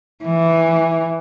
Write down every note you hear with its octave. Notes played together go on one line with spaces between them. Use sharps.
E3